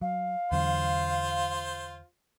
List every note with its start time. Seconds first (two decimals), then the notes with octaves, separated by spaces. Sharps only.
0.01 F#3 F5
0.52 E2 D3 F#3 F4 C5